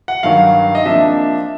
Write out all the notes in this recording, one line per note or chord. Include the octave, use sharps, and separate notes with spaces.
F#5
G2 D#3 F#3 F5
D#5
C3 F3 A#3 D4 E5